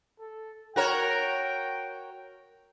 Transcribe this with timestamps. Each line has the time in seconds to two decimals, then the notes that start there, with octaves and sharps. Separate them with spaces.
0.20 A4
0.76 F#4 A#4 C#5 G5